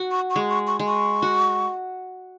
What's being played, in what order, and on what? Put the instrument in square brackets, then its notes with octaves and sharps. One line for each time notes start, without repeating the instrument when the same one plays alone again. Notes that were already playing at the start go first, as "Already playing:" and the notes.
Already playing: [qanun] F#4
[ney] C#6
C#6
[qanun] G#3
[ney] C#6
C#6
[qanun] G#3
[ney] C#6
[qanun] F#4